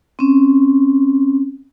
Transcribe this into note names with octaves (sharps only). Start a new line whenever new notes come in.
C4 C#4